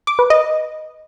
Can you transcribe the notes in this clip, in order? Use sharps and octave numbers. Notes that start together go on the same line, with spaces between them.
D6
B4
D#5